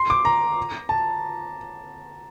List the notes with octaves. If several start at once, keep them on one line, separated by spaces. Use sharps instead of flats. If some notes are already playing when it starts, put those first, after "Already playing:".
Already playing: C6
D6
A#5
A5